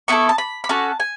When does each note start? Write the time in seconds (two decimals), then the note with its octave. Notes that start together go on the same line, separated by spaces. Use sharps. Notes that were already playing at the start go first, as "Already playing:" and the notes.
0.08 B3 E4 A4 C#6
0.29 A5
0.38 B5
0.64 B5
0.69 C#4 F#4 A4 A5
1.00 G#5